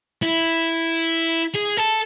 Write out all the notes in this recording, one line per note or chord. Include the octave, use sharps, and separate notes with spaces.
E4
G#4
A4